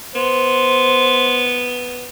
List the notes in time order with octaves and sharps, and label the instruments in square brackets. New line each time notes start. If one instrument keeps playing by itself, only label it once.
[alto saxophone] B3 [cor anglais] C5